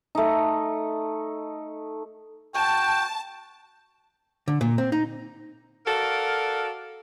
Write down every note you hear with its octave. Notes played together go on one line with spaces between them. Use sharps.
A3 D#4
F#4 G5 A5
D3
A#2
C4
D#4
F#4 A4 A#4 D5 F5